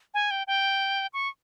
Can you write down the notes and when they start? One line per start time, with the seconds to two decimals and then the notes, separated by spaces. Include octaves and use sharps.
0.14 G#5
0.31 G5
0.47 G5
1.14 C#6